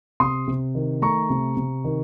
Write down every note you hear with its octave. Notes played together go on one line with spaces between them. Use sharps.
C3 C6 D#6
C3
D#3
A3 A#5 C#6
C3
C3
D#3